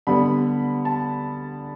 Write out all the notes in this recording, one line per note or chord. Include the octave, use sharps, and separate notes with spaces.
D3 G3 B3 B5
A5